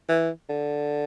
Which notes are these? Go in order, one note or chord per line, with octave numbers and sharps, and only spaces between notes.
E3
D3